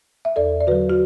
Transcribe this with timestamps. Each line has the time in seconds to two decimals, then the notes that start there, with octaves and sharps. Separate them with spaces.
0.25 E5
0.36 E2 A4 D5
0.61 D5
0.67 D3 F#3 F#4 B4
0.90 F#4